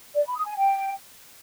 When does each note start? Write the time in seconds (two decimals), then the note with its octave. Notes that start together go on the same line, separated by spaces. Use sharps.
0.14 D5
0.25 B5
0.35 D#6
0.45 G#5
0.56 G5